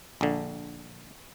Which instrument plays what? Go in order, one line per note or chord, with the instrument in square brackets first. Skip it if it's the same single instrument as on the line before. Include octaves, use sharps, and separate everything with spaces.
[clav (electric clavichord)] A#1 D3